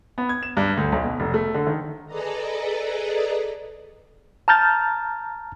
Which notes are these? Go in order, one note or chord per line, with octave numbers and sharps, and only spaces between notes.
B3
G#6
E7
G2
D2
B1
B2
F1
A3
D3
D#3
G#4 A4 B4 D5 D#5 A#5
A5 A#5 F6 G6 A6